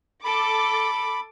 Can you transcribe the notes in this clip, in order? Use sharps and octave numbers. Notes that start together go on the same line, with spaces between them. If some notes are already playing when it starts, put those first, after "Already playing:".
A4 B5 D6